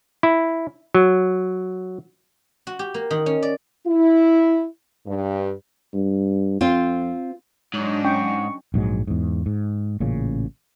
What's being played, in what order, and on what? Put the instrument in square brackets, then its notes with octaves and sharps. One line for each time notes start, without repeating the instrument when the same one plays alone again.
[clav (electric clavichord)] E4
F#3
[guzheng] F#4
G4
A#3
D#3
C#4
D5
[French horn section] E4
G2
[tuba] G2
[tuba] F2 [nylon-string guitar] C4 F4
[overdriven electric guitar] G#2 [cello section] F#3 D4 D#4 [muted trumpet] C#5
[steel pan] C#4 G5 [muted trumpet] C#6
[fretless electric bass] A#1 G#2 F#3 G#3
E2 G#2
G#2
A1 A#2 C#3